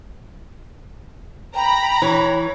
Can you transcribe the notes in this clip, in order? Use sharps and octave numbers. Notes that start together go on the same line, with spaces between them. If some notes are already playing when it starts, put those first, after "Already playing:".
G5 A#5 B5
E3 C#5